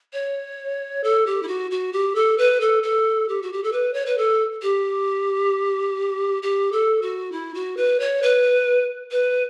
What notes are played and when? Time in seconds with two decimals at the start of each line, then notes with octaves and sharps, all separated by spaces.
0.13 C#5
1.04 A4
1.26 G4
1.43 E4
1.48 F#4
1.71 F#4
1.93 G4
2.15 A4
2.38 B4
2.61 A4
2.83 A4
3.28 G4
3.43 F#4
3.53 G4
3.64 A4
3.72 B4
3.94 C#5
4.06 B4
4.18 A4
4.62 G4
6.43 G4
6.72 A4
7.02 F#4
7.32 E4
7.54 F#4
7.77 B4
8.00 C#5
8.22 B4
9.11 B4